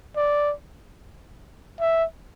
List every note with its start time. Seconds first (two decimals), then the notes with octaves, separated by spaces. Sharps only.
0.16 D5
1.80 E5